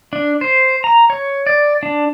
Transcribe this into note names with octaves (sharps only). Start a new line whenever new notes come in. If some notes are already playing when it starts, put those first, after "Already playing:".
D4
C5
A#5
C#5
D5
D4